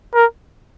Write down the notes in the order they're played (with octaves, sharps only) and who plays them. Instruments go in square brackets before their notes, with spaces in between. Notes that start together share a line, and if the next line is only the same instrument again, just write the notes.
[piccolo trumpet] A#4